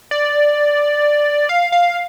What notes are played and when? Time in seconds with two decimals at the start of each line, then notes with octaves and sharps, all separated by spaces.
0.11 D5
1.49 F5
1.72 F5